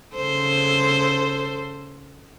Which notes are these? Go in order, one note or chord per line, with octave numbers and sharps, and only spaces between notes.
C#3 A4 C5